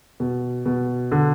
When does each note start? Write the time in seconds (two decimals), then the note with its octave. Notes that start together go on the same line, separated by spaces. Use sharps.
0.20 B2
0.66 B2
1.12 D3